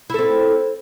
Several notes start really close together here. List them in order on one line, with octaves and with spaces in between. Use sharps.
E4 A4 C4